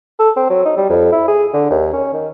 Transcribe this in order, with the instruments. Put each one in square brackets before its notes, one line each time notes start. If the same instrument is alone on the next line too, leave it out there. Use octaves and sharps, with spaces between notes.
[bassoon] A4
C4
F#3
D#4
G3
F2
E4
G#4
D3
D#2
C#4
D#3